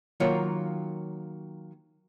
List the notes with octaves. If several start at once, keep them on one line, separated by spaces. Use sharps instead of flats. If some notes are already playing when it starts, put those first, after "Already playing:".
D#3 F#3 A#3 F4 A#4 C#5